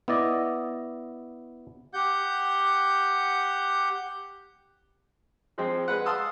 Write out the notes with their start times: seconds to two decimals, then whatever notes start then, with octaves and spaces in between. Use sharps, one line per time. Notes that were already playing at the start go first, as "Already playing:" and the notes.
0.08 B3 E4 D5 D#5
1.94 G4 F#5 G6
5.58 F3 G#3 C4
5.88 G#3 B4 F#5
6.06 F5 A5 C6 D#6 E6